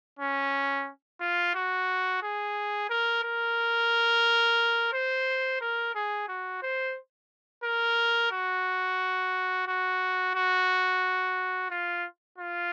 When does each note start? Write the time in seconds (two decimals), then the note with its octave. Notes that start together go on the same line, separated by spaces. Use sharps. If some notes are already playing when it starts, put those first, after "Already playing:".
0.19 C#4
1.20 F4
1.54 F#4
2.22 G#4
2.90 A#4
3.23 A#4
4.93 C5
5.61 A#4
5.95 G#4
6.28 F#4
6.62 C5
7.64 A#4
8.32 F#4
9.67 F#4
10.35 F#4
11.70 F4
12.38 F4